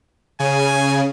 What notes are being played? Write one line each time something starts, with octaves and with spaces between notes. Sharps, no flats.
C#3 G#5